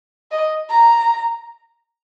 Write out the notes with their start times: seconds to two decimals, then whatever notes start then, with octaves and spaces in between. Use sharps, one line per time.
0.31 D#5
0.70 A#5